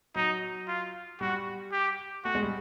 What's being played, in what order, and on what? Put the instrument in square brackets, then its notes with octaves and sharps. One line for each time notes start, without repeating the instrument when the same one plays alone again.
[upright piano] F#3 [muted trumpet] D#4
[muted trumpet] F4
[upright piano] G3 [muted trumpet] F#4
[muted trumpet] G4
[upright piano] A3 [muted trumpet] F#4
[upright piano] G#3
G3